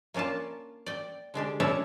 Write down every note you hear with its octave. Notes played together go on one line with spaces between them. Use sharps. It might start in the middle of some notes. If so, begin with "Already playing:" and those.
A#3 C#4 D4 F4 A5
D5 G5
D3 G#3 D4 G4
C#4 D4 E4 A4 C#5